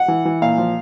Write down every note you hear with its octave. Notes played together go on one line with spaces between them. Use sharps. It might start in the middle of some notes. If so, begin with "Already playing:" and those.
Already playing: F#5
E3
E3
A#2 F5
F3